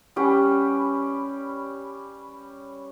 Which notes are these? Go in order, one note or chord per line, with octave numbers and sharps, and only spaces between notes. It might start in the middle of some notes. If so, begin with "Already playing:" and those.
G3 C#4 G4 B4